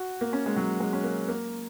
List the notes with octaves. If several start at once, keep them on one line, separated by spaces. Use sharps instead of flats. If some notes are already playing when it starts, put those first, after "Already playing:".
Already playing: F#4
A#3
C#4
G#3
F#3
G#3
C#4
A#3
A#3